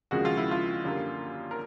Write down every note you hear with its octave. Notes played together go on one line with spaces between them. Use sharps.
D#2 C#3 F3 G#3 F#4
F4
E4
F4
F#2 D3 G3 A#3
A#4